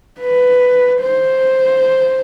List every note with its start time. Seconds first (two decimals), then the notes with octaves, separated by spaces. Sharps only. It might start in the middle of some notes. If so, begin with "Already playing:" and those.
0.20 B4
1.00 C5